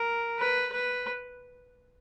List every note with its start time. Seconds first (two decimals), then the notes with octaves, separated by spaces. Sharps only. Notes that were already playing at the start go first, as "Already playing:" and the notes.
Already playing: A#4
0.39 B4
0.73 B4